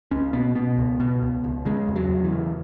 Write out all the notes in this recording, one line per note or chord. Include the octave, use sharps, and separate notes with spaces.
C#2 C#4
B2 B3
B2 B3
C#2
B2
C#2
C#2
C#3 G#3
E2
F#3
E2
E3
C#3